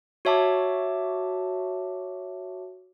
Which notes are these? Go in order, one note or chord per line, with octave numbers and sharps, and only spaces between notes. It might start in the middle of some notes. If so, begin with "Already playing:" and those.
F#4 C#5 E5 A5 D6